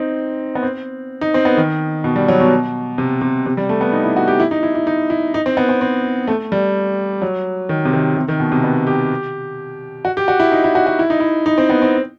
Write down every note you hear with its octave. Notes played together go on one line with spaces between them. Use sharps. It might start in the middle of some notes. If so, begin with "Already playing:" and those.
Already playing: C4 D#4
B3
C4
D#4
C4
B3
D#3
B2
G3
F#3
B2
C3
C3
C3
G3
A3
B3
D#4
E4
F#4
G4
E4
D#4
E4
E4
D#4
E4
D#4
C4
B3
C4
C4
A3
G3
F#3
D#3
C3
D#3
C3
D#3
B2
C3
B3
G4
F#4
G4
F#4
E4
D#4
E4
F#4
F#4
E4
D#4
E4
D#4
C4
B3
C4